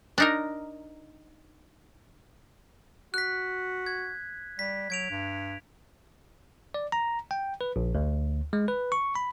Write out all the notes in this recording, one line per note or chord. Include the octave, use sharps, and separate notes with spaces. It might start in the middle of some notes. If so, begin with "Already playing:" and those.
D4 D#4 A#4
F#4 F#6 B6
G#6
G3 B6
F#3 G#6 D7 F7
G2
D5
A#5
G5
B4
A#1
D2
G#3
B4
C#6
B5